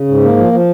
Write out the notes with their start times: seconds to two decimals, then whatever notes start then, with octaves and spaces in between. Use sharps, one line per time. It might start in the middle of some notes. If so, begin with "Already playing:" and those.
Already playing: C#3
0.08 G#2
0.22 A#3
0.37 F3
0.53 F3